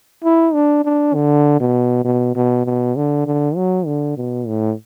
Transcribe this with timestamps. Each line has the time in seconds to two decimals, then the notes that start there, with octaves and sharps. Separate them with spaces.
0.24 E4
0.54 D4
0.85 D4
1.14 D3
1.60 B2
2.05 B2
2.36 B2
2.66 B2
2.96 D3
3.26 D3
3.56 F#3
3.86 D3
4.17 B2
4.47 A2